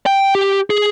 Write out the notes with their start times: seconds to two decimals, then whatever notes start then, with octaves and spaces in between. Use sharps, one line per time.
0.06 G5
0.35 G4
0.70 G#4